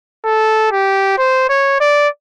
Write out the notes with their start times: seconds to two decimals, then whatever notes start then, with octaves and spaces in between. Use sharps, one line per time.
0.25 A4
0.72 G4
1.18 C5
1.49 C#5
1.80 D5